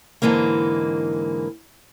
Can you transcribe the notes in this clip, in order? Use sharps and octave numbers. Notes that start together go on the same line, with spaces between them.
G#2 D3 E3 G#3 A#3